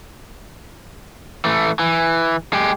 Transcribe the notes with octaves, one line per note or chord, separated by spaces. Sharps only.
E3 A3
E3
G#3 G4